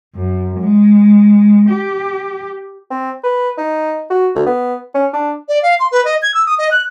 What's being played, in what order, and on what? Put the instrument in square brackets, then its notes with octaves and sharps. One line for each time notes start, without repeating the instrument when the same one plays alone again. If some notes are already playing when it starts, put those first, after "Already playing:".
[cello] F#2
G#3
G4
[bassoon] C4
B4
D#4
F#4
D2
B3
C#4
D4
[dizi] D5
F5
C6
B4
D#5
G#6
E6
D#6
D#5
F#6